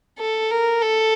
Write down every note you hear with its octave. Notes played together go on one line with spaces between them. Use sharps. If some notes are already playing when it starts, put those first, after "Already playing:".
A4
A#4
A4